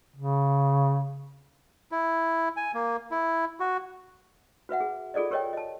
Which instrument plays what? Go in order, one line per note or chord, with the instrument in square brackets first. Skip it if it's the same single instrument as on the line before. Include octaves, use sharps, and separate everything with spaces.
[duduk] C#3
[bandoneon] E4
G#5
A#3
E4
F#4
[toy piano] F#4 B4 E5 F#5
G#4
F4 G#4 A4 D5 D#5
G4 A#4 C#5 D#5 G5
D#5 A5